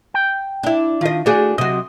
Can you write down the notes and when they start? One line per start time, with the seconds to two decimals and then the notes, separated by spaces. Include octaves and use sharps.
0.14 G5
0.63 D4 E4
1.01 D#3 D4 F4 D#5
1.26 A3 D4 F#4 G#4
1.58 C3 F#3 F#4 D#5